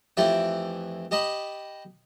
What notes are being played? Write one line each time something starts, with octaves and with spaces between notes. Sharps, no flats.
F2 E3 A3 G4 D5 G5
G4 D#5 A5 B5